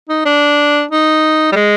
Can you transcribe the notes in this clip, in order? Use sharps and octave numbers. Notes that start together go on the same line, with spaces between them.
D#4
D4
D#4
G3
G#3